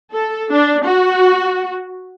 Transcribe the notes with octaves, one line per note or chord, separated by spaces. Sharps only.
A4
D4
F#4